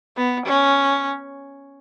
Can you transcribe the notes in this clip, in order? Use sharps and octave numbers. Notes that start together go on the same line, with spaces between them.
B3
C#4